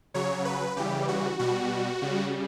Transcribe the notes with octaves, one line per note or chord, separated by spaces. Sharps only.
C#3 F#3 C#5
B4
C#3 E3 G3 G4
F#4
B2 G3 F#4
C#3 G3